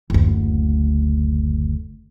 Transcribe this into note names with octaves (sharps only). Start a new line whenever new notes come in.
F#1 D2